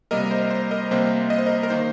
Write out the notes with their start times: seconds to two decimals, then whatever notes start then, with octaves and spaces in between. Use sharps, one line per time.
0.11 C3 G3 A#3 A#4 D#5
0.31 C5
0.50 C5
0.71 A#4 D#5
0.91 C3 G3 A#3 C5
1.30 D#5
1.38 C5
1.46 A#4 D#5
1.63 A#4
1.70 D#3 A#3 D#4 C5